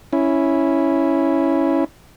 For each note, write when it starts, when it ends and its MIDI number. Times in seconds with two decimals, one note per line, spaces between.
0.13 1.84 61
0.13 1.84 64